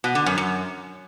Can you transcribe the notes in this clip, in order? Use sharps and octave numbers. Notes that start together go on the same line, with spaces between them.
B2
D3
F#2
F#2